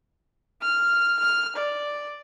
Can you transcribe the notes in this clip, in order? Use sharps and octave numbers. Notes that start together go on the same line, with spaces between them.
F6
F6
D5